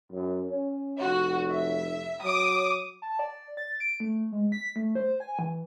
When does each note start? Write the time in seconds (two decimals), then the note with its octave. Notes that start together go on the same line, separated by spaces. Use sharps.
0.12 F#2
0.50 C#4
1.00 F1 F#4
1.51 E5
2.23 F#3 D6 D#6
3.02 A5
3.19 D5
3.57 A6
3.80 D7
4.00 A3
4.32 G#3
4.52 B6
4.76 A3
4.95 C5
5.20 G#5
5.39 E3